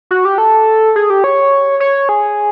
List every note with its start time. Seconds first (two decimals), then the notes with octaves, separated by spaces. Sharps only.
0.11 F#4
0.25 G4
0.38 A4
0.96 G#4
1.10 G4
1.24 C#5
1.80 C#5
2.09 G#4